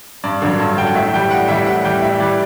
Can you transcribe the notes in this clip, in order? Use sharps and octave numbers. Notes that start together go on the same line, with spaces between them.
G2 D5
D3 F#3
G2
D3 F#3 G5
F#5
A2 E5
E3 G3 G5
A2 F#5
E3 G3 E5
A2 F#5
E3 G3 G5
A2 E5
E3 G3 D5